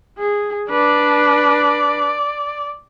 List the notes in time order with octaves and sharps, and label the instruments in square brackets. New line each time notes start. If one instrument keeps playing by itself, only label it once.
[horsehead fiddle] G#4
[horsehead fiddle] D4 B4 [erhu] D5